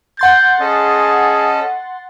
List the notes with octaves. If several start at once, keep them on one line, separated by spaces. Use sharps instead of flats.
F#5 C6 G6 A6
C#4 G#4 A4 D#5